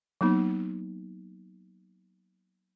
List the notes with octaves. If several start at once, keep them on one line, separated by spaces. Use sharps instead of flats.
F#3 A#3 B3 D#4